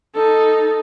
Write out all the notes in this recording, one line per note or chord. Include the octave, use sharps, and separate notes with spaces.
D#4 A4